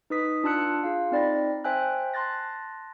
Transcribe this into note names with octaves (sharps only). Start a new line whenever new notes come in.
D#4 B4 D#6 B6
D4 F4 A5 E6 F#6 C#7
F4 G#4 F5
C4 D#4 D5 B5 A6 A#6
C5 E5 G5 G#5 E6 F#6
A5 C6 F#6 A6 A#6